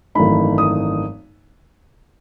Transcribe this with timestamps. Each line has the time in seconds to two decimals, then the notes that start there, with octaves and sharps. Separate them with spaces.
0.15 G#1 F#2 E3 A3 D#4 B5
0.58 D#6